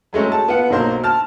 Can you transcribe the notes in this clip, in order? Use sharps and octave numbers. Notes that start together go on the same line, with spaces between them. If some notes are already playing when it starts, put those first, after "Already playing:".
F#3 G#3 A3 C#4
A5
B3 F4 F#5
B1 F#3 A#3 C5 C6
A5 F6